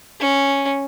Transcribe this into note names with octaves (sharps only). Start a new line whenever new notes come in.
C#4